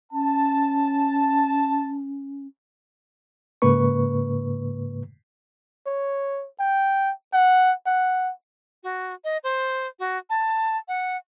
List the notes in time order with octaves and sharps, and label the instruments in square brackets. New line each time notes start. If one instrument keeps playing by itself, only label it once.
[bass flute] C#4 [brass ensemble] A5
[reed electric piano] G#2 C#3 A#3 B4 C#6
[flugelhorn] C#5
G5
F#5
F#5
[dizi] F#4
D#5
C5
F#4
A5
F#5